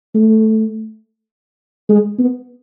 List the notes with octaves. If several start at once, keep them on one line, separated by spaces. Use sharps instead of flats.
A3
G#3
B3